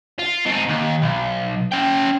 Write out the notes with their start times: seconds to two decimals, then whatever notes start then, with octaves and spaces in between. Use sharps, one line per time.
0.19 F4
0.46 C4 D#4
0.69 D#2
1.02 B1
1.72 C#4 G5